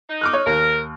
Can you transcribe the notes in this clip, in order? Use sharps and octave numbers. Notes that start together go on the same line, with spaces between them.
D#4
D6 F6 F#6
C#5
D#2 A#4